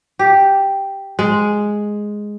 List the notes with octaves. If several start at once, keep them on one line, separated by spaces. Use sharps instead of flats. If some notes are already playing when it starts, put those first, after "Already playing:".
G4
G#3